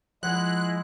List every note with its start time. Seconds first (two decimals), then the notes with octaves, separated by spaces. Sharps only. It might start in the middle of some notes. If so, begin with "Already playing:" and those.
0.23 F3 G#3 E4 F#5 F#6